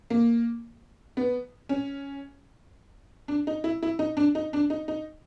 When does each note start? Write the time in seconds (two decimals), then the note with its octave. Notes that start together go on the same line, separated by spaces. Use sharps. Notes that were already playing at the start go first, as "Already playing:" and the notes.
0.10 A#3
1.17 B3
1.69 C#4
3.28 D4
3.47 D#4
3.64 E4
3.83 E4
3.99 D#4
4.17 D4
4.35 D#4
4.53 D4
4.70 D#4
4.88 D#4